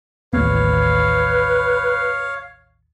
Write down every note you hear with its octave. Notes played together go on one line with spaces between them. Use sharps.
A1 D#2 B3 B4 C#5 F5